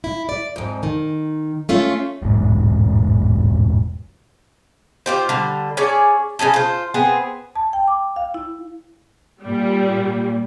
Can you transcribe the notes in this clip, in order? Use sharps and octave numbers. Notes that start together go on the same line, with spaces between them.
E4
D5
F2 G#2
D#3
A3 C#4 F4
E1 A1 G#2
F4 G4 C5
D3 G3
C#4 G#4 C#5 D5
C#3 C#4 G#4 A4
F4 C5
B3 C4 G#4
A5
G5
D6
F5
E4
A#2 G3